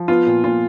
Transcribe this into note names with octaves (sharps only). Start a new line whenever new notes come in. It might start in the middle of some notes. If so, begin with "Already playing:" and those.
Already playing: F3
B3 F4
A#2
A#2 F4